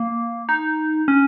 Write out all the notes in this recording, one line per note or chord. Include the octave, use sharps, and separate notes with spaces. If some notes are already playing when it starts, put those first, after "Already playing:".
Already playing: A#3
D#4
C#4